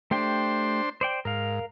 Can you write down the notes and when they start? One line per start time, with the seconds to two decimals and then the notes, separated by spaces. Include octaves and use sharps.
0.11 A3 D4 G4 C5 G5 C6
1.01 C5 D5 G5
1.25 G#2 A#4 F5